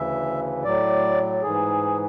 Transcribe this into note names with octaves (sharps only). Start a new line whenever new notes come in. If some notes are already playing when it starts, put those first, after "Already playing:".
Already playing: D2 C#3 E3 E5
A2 F#3 D5
G#2 E3 G#4